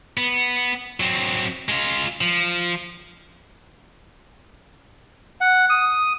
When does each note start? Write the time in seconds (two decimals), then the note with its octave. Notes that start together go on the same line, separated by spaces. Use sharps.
0.17 B3
1.00 F#3 C4
1.69 G#3 F4
2.21 F3
5.41 F#5
5.70 D#6